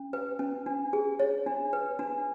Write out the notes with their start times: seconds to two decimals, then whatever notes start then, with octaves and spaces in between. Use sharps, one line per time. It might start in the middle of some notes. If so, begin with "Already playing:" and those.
Already playing: C#4
0.13 B4
0.39 C#4
0.66 D4
0.93 G#4
1.19 C#5
1.46 D4
1.73 B4
1.99 D4